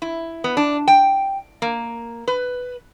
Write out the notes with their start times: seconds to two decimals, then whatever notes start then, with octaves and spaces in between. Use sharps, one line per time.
0.02 E4
0.44 B3
0.57 D4
0.88 G5
1.62 A#3
2.28 B4